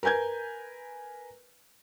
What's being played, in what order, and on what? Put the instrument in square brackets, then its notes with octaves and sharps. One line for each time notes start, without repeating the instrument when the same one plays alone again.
[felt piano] A#4 B4 G#5 G6 G#6